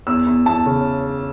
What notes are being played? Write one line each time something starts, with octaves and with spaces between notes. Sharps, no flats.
E2 E6
E2
E2 A5
C#3